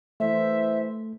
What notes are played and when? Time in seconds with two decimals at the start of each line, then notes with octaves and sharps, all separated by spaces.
0.20 E3 A3 C5 E5